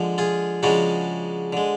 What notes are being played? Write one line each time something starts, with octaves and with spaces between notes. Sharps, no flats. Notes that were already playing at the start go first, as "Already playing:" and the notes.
Already playing: D3 F3 G#3
F4 G#4
C#3 F3 G#3 D4 F#4
D3 G#3